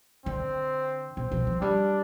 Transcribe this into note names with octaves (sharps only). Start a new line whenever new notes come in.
D3 C4
B2 C4
F3
F3
G3 D4